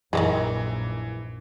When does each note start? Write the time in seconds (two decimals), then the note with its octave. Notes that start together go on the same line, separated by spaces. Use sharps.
0.13 A#1 F#2 A#2 D#3 E3 G3 G#3